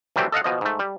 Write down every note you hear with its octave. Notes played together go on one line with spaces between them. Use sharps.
E3 F#3 G3 A3 C4
A4 D#5 F5 F#5
B2 F3 D#5
G#2 A3
G3